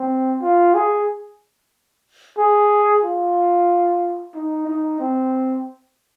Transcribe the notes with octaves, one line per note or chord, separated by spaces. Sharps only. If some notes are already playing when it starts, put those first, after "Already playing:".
Already playing: C4
F4
G#4
G#4
F4
D#4
D#4
C4